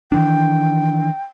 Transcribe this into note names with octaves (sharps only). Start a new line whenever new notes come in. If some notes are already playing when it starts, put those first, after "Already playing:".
D#3 E3 D4 G5